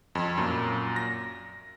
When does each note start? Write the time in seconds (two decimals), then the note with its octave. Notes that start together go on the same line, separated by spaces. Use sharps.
0.15 F2
0.37 F#2 A#2
0.96 A#6